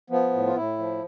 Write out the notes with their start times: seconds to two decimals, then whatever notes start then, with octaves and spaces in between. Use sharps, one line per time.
0.10 F3 B3
0.33 A2
0.47 F4
0.55 A2 E4
0.78 F3